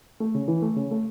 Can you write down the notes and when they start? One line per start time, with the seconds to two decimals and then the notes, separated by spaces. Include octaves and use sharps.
0.20 A3
0.34 C#3
0.48 E3
0.62 A3
0.76 C#3
0.91 A3